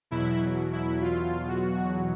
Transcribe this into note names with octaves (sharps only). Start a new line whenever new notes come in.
E2 B2 F#3 E4
E4
F4
F#4